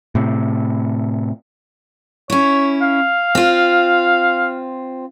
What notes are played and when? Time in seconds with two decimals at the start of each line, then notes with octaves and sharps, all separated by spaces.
0.15 A2 C3
2.30 C#4 E4 C#5
2.81 F5
3.35 C4 F4